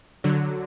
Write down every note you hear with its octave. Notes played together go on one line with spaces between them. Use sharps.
D3 F#3